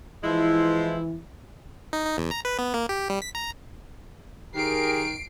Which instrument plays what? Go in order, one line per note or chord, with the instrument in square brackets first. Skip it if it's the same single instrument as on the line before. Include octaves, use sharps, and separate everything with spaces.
[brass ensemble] E3 [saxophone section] F3 G#3 E4
[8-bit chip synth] D#4
D#4
E2
A#5
B4
B3
A#3
G4
G3
B6
A#5
[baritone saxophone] D#3 [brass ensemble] G4 G#4 A#4 [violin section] C7 D7